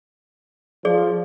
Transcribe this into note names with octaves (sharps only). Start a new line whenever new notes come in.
F3 G#4 D5